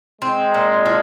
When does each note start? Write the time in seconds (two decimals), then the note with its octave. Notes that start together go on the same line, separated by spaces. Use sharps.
0.21 G#3 C4
0.54 A#2
0.86 F3